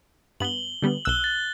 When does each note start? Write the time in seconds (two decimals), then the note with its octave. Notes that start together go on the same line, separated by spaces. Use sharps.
0.40 G2 B3 F#7 G7
0.82 D3 G3 B3
1.05 B1 E6 F#6 G7
1.24 A6